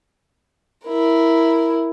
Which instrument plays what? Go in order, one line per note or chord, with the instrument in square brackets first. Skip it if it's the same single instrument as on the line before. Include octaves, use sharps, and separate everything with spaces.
[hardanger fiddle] E4 A#4